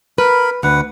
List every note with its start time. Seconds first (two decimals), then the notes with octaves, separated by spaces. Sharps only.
0.18 A#4 B4 B5
0.63 D2 B4 F#5